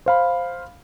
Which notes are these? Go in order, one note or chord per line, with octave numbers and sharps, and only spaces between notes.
C5 F5 B5